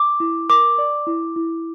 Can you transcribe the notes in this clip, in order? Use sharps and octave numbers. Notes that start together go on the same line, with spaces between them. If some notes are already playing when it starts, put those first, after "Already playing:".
Already playing: D6
E4
A#4 D6
D5
E4
E4